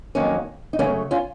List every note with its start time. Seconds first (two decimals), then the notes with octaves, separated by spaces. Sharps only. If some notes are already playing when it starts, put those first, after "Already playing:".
0.15 F2 D#3 F#3 A#3 C#4
0.73 D#4
0.79 F#2 C#3 F#3 A3 A#3 C#4
1.11 C#4 F4